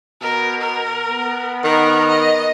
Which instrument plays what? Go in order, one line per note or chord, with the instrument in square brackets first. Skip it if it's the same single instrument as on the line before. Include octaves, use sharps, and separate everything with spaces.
[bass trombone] B2 [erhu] A#4
[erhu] A#4
[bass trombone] B3
[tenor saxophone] D#3 [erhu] A#4
[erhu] D#5